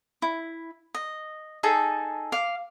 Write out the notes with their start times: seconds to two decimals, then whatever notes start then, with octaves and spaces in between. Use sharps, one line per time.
0.22 E4
0.94 D#5
1.63 D#4 G#4 A4 A5
2.32 F5 D6